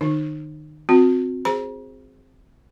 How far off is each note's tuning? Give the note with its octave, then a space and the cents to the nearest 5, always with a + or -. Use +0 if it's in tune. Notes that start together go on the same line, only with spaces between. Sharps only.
D#3 -40 D#4 -30
C4 -5 F#4 -30
G#4 -15 C5 +10 A#5 +40